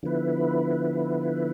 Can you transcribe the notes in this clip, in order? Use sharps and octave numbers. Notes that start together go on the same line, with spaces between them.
D3 F3 B3 E4 B4